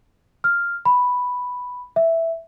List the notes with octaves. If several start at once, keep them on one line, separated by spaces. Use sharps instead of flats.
F6
B5
E5